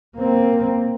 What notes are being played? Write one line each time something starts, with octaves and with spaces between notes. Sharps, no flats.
A#3 C4